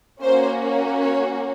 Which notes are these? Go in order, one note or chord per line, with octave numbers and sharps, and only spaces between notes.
A#3 C#4 F#4 C5
C#5